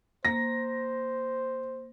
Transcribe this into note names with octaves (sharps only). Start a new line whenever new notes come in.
A#3 C5 A#6